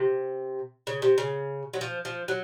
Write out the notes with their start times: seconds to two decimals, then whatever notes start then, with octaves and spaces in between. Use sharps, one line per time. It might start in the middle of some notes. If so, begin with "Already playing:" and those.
Already playing: C3
0.87 C#3
1.02 C3
1.18 C#3
1.73 F#3
1.81 F3
2.05 F3
2.28 F#3